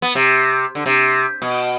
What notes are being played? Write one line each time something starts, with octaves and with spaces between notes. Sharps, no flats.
B3
C3
D3
C3
B2